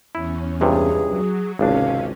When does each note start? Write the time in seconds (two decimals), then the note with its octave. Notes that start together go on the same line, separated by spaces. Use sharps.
0.15 E2 C#4 E4
0.61 C#2 G2 C3 G#4
1.08 F#3
1.59 G#1 C#2 C3 C#4 D4 F5